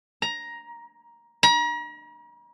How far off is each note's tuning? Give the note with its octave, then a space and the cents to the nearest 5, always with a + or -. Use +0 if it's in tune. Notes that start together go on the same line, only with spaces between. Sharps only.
A#5 +10
A#5 +40